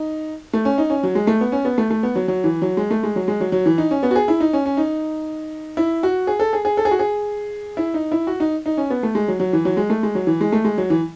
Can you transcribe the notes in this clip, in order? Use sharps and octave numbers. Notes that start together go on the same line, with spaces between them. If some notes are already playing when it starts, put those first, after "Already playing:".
Already playing: D#4
A3
C#4
D#4
C#4
F#3
G#3
A3
B3
C#4
B3
A3
A3
B3
F#3
F#3
E3
F#3
G#3
A3
G#3
F#3
G#3
F#3
F#3
E3
D#4
C#4
B3
F#4
G#4
E4
D#4
C#4
C#4
D#4
E4
F#4
G#4
A4
G#4
G#4
A4
G#4
F#4
G#4
E4
D#4
E4
F#4
D#4
D#4
C#4
B3
A3
G#3
F#3
F#3
E3
F#3
G#3
A3
G#3
F#3
E3
G#3
A3
G#3
F#3
E3